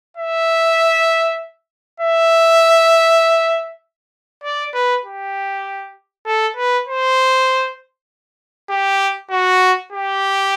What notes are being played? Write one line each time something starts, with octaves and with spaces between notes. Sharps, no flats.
E5
E5
D5
B4
G4
A4
B4
C5
G4
F#4
G4